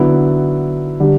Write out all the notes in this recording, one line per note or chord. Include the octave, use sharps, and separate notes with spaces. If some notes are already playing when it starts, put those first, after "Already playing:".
Already playing: D3 F#3 B3 E4
D3 G3